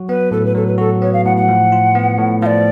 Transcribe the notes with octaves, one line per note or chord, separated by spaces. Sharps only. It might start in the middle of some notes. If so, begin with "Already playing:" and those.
Already playing: F#3 F#4
B3 B4
A2 A4
B4
F#3 A4
B4
F#4 A4
B3 C#5
F5
A2 F#5
F#5
F3
F4
B3
A2
F3 D5 F5